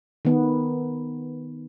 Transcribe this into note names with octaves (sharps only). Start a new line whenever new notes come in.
D#3 B3